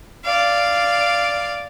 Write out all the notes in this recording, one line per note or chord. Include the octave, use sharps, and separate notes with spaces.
D5 F5